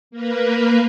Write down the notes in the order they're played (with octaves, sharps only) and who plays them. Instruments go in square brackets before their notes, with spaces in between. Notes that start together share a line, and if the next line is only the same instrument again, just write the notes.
[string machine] A#3 A#4 B4